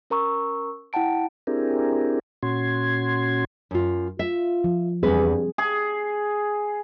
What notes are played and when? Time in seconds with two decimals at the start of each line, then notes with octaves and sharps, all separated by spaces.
0.10 C#4 A#4 A#5 C#6 E6
0.93 E4 F#5 G5 A5 D7
1.47 C4 D4 E4 G4 G#4 A#4
2.43 A#2 C#4 F#4 C6 G#6
3.71 F#2 F4
4.19 F4 E5
4.64 F3
5.03 E2 G2 G3 C4 G#4 B4
5.58 G#4